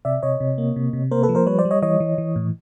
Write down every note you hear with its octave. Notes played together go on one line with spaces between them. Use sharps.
C3 D5 E5
C3 C#5 D#5
C3
A#3
C3
C3
A#3 A#4 C5
A4 B4
F3
A#4 C5
G3 B4 C#5
C5 D5
G3
C#5 D#5
E3 C#5 D#5
E3
E3
A2